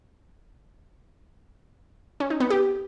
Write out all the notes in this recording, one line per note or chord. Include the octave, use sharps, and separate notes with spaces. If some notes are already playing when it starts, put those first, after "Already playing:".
C#4
D#4
B3
G4